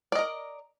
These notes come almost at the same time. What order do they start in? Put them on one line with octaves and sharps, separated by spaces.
D5 D#5 A#4